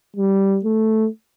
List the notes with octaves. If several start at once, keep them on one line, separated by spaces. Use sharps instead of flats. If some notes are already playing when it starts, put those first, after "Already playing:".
G3
A3